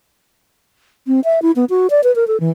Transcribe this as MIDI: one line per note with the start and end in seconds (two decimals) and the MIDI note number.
1.07 1.20 60
1.24 1.42 76
1.42 1.51 64
1.56 1.65 59
1.70 1.87 66
1.90 2.03 74
2.04 2.14 71
2.16 2.27 70
2.27 2.39 69
2.40 2.50 52